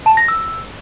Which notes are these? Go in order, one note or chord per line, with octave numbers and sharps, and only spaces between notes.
A5
A#6
E6